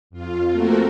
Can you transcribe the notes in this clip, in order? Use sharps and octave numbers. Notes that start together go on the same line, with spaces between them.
F2 F4
A3 A#3 C4 F#4 A4 A#4